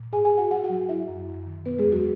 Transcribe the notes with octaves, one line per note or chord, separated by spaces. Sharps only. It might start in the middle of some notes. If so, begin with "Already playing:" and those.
Already playing: A#2
G#2 G#4 G#5
G#4 G#5
G#2
F#4 F#5
F#3 F#4 F#5
F#4 F#5
F#3
F#3 E4 E5
F#2
F#2
D#3
B2 B3 B4
G#3 G#4
E2
F#3 F#4